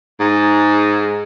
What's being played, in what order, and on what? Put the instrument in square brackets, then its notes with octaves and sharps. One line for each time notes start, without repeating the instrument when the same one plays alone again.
[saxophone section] G#2